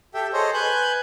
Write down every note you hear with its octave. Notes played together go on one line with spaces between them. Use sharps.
G4 A4 E5 G5
G#4 A4 C5 C#5 D#5
B4 G#5 F#6 G6